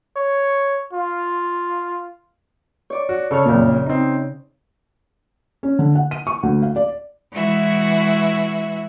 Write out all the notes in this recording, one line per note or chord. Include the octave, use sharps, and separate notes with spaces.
C#5
F4
C#5 D5 D6
F#4
C#3 A4 C#5 C#6 F6
F#1 F2 A#2
C4 D#4
C#4
D3
F#5
D#7
C#6
D2
F5
D5
E3 G#3 E4 F#4 E5